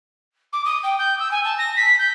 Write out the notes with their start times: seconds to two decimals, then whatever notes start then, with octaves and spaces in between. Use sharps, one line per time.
0.53 D6
0.65 D#6
0.83 G5
0.99 G6
1.19 E6
1.31 G#5
1.44 A5
1.58 A#6
1.76 B6
1.99 G6